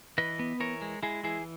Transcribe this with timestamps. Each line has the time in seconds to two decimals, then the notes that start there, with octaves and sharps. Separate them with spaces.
0.18 E3 B4 D#5
0.39 B3
0.60 E3 A#4 C#5
0.82 G#3
1.03 G#3 E4 G#4
1.24 E3 E4 G#4